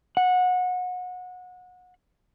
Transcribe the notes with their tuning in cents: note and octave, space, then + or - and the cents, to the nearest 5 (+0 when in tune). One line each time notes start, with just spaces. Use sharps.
F#5 -25